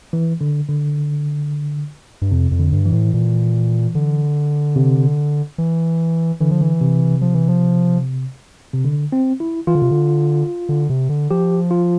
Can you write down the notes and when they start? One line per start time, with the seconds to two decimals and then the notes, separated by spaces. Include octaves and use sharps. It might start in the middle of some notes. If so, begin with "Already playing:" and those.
0.13 E3
0.41 D3
0.68 D3
2.22 G2
2.31 F2 C3
2.51 F2
2.59 D3
2.72 G2
2.86 E3
2.92 A2
3.14 A#2
3.95 D3
4.76 C3
5.58 E3
6.40 D3 E3
6.51 F3
6.61 E3
6.81 C3
7.21 F3
7.35 E3
7.49 F3
8.74 C3
8.85 D3
9.12 C4
9.40 E4
9.67 E3 F4
9.75 D3
9.82 C3
9.91 D3
10.69 D3
10.90 C3
11.09 D3
11.31 F3 G4
11.71 F4